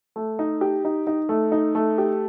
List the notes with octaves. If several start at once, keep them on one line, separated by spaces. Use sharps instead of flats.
A3
D#4
G4
D#4
D#4
A3
D#4
A3
G4